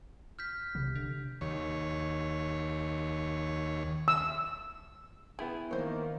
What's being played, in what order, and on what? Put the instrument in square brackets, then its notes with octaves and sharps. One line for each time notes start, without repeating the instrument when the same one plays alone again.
[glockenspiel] F6 G6 B6
[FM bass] B1 [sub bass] C3
[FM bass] D3
[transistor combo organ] D#2 C#5
[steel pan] E6
[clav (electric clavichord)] B3 E4 G5 [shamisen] G#4
[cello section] D#3 [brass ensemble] A#3 [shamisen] C5 C#5